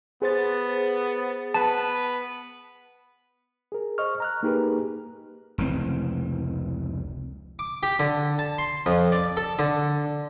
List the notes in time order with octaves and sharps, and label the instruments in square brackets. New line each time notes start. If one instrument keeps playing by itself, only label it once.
[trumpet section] B3 [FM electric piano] G#4 C5 A6
[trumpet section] B3 B4 [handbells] A5
[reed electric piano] G#4 A#4
C5 D#5 C#6 F6
A#5 F6 F#6
A#3 D#4 G4 G#4 A#4 B4
[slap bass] F1 C#2 E3 C4
[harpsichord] D6
G4
D3
A5
C6
F2
D5
A4
D3